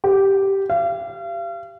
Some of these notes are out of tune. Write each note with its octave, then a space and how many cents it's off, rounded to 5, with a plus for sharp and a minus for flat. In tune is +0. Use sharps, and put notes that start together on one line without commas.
G4 -5
F5 -40